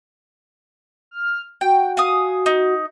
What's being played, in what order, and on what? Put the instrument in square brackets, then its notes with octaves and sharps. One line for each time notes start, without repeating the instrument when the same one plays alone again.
[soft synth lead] F6
[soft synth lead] F#4 [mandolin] G5
[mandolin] F5 G#5 D#6
D#4